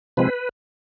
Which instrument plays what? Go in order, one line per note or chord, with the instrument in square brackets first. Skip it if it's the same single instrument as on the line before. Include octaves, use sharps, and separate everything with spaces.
[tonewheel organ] C3 F3 G#3 C4 B4